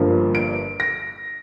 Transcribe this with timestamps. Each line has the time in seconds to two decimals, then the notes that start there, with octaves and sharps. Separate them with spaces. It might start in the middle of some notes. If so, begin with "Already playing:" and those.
Already playing: G1 G2 F3 A#3
0.35 D7
0.80 A#6